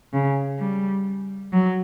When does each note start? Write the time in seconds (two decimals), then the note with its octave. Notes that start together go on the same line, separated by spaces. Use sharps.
0.13 C#3
0.59 G3
1.53 F#3